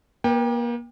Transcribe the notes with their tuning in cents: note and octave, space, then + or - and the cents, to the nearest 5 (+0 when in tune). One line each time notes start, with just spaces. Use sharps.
A#3 +35 B4 +0 G5 +20